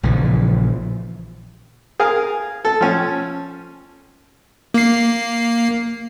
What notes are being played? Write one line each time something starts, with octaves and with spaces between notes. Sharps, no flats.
A#1 C#3 E3 F3
G#4 A#4 F5
A4
F3 C#4
A#3 C7